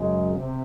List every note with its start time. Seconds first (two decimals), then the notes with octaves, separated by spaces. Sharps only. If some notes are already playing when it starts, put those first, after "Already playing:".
Already playing: F#2 C#3 G#3
0.34 C3